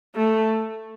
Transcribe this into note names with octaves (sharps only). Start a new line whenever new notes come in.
A3